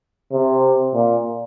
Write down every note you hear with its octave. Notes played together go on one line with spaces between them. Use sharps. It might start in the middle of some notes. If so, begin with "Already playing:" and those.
C3
A#2